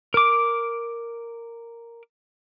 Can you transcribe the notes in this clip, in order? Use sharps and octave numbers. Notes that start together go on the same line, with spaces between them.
A#4 D6